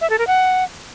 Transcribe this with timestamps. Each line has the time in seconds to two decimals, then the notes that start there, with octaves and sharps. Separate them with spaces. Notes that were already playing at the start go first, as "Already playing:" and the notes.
0.01 E5
0.10 A4
0.19 A#4
0.27 F#5